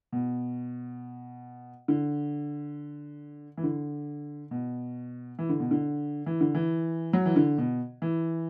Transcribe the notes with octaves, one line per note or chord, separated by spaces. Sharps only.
B2
D3
E3
D3
B2
E3
D3
B2
D3
E3
D3
E3
F#3
E3
D3
B2
E3